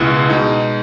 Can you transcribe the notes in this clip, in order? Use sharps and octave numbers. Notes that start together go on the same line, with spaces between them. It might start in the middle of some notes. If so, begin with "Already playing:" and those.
Already playing: C#2 B2 G#3 B3 E4
B2 G#3 D#4